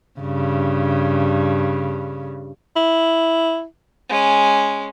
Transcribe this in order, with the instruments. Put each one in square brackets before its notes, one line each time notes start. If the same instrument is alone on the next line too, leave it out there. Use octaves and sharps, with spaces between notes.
[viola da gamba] G2 C#3
[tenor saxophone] E4
[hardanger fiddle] G#3 C#4